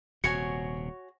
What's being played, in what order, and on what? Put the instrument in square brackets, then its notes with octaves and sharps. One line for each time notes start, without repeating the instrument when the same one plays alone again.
[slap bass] D#1 C3 [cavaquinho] F#4 C#5 G#5 [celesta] C#7